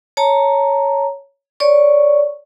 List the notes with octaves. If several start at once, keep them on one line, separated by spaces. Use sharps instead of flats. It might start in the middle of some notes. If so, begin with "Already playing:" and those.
C#5 A5 A#5
C#5 D5 C#6